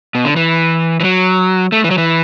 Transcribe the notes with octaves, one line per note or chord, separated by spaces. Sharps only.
B2
D3
E3
E3
F#3
A3
E3
F#3
E3